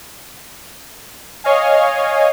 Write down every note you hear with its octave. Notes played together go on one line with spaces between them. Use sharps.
C#5 D#5 F5 G#5